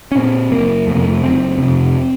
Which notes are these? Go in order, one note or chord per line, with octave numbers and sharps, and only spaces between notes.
C#4
A#2 C4
F#1 A#3
F2 C3 A3 A#3
A3
F#1 C4
F2 C3